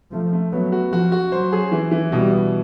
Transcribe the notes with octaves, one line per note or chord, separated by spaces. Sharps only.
F3 A3
A3
F#3 B3
F#4
F3 F#4
F#4
F#3 C5
G#4
E3
E3
B2 G3
B2